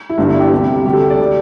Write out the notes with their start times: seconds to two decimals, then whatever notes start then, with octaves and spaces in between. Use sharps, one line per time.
0.10 E4
0.18 G1 G2 D3 D4
0.29 E4
0.40 G4
0.52 D2 C3 G3
0.85 D2 D3 G3 G4
0.93 A4
1.10 D5
1.19 D3 G3